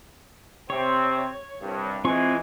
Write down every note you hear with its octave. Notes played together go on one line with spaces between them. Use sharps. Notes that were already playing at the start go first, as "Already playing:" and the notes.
C3 C4 C#5
C2 G2
E3 G#3 C4 F4 G#5 C#6